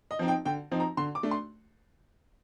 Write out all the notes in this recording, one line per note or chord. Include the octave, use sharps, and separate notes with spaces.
D#5
F3 C4 D#4
G5
D3 G5
F3 C4 D#4
A#5
D3 C6
D6
A3 D4
C6